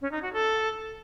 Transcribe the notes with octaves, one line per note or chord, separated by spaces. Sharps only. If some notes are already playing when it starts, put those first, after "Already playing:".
C#4
D#4
F#4
A4